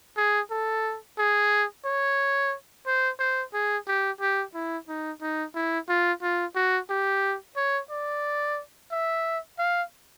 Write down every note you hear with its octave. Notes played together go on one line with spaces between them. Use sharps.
G#4
A4
G#4
C#5
C5
C5
G#4
G4
G4
E4
D#4
D#4
E4
F4
F4
F#4
G4
C#5
D5
E5
F5